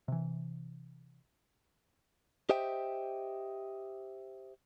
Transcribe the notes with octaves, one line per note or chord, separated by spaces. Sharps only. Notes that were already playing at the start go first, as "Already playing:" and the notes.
C3 E3
G4 C5 D#5 E5 G5